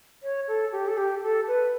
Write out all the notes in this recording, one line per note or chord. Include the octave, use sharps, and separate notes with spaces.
C#5
A4
G4
A4
G4
A4
B4